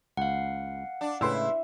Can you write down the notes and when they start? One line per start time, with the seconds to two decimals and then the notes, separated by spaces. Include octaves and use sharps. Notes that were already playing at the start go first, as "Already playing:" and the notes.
0.17 C#2 F5 F#5
1.01 D4
1.21 A2 C#3 G#3 E4 B4 C6 E6